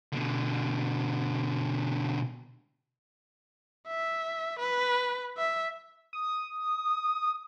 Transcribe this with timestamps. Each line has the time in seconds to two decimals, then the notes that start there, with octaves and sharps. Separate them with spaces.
0.12 B2 D3
3.88 E5
4.59 B4
5.38 E5
6.13 D#6